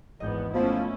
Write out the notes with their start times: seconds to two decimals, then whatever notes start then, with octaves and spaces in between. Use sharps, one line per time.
0.20 G#1 E2 B3 D#5 G6
0.54 F3 A3 B3 C#4 E4 B4 C5